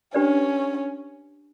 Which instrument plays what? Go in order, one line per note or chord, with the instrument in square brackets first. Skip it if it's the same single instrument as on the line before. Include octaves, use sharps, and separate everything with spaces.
[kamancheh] C#4 [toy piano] D4 G4 B4 D5